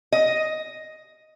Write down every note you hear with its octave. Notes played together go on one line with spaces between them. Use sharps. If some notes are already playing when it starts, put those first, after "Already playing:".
D#5